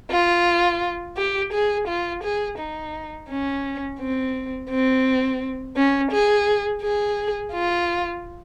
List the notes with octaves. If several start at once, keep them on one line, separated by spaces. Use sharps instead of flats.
F4
G4
G#4
F4
G#4
D#4
C#4
C4
C4
C#4
G#4
G#4
F4